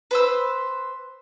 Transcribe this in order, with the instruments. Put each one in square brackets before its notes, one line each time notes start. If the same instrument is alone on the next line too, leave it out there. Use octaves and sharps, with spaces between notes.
[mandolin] B4 C5 E6